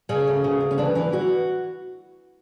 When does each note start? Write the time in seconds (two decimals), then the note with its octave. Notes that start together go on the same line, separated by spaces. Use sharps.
0.09 C#3 C#4
0.27 D2
0.44 C#3
0.61 D2
0.71 C#4
0.78 E3 D4
0.95 E3 E4
1.12 E3 F#4